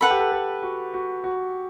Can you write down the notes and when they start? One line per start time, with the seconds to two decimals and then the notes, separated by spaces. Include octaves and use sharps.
0.01 A4 B4 F#5 B5
0.11 G4
0.20 A4
0.32 A4
0.63 F#4
0.94 F#4
1.24 F#4